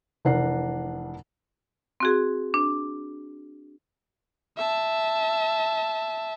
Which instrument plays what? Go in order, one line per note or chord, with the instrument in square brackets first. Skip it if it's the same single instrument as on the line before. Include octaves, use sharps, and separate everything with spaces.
[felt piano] F1 E3 D4 A#4 F#5 C7
[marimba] C4 F#4 G#4
D4
[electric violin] E5 A5